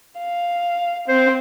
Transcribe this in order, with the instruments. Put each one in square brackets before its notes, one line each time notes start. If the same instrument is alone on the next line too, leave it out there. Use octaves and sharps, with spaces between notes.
[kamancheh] F5
[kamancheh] C4 [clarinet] C5